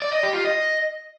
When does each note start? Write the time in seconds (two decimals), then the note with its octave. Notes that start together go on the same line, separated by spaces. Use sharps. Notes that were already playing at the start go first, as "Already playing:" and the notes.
0.02 D5
0.13 D#5
0.23 G4
0.34 F4
0.45 D#5